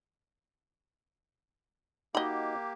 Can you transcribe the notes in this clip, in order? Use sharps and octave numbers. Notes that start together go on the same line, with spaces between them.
A#3 D#4 F#4 G4 D#5 B5